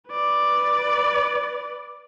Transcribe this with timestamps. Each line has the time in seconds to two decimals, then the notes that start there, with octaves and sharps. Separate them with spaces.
0.10 B4 D5